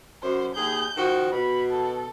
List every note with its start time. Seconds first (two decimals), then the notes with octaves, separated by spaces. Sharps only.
0.22 F#2 C5
0.55 D#2 G#4 G6
0.97 D#3 F3 F#4
1.32 B2 B5
1.70 A4